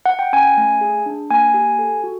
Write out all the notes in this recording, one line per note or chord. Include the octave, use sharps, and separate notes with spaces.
F#5
G5
C#4 G#5
A3
G#4
D4
A#3 G#5
G4
A4
F#4